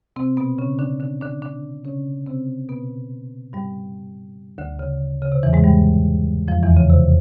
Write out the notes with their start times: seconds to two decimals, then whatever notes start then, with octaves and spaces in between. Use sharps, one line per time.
0.16 C3 C4
0.37 B2 B3
0.58 C#3 C#4
0.79 D3 D4
1.00 D3 D4
1.21 D3 D4
1.42 D3 D4
1.85 C#3 C#4
2.26 C3 C4
2.69 B2 B3
3.53 G2 G3
4.58 D2 D3
4.79 C#3
5.22 C#3
5.32 C3
5.43 E2 E3
5.53 G#2 G#3
5.63 G2 G3
6.48 F2 F3
6.63 E2 E3
6.77 C#3
6.90 C3